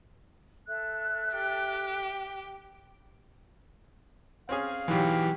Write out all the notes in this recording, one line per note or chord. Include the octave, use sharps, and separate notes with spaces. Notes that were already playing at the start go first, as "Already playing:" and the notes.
A4 E5 F#6
G4
C4 C#4 G#4 F5
G#2 B2 E3 F#3 G4